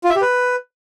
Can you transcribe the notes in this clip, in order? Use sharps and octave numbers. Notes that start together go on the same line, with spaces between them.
F4
E5
G4
B4